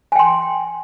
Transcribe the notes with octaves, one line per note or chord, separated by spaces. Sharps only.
G5 G#5 C6